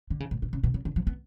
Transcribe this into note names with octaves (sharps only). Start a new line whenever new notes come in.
D3
C#3
A2
B2
C#3
B2
C#3
D3
F3
B3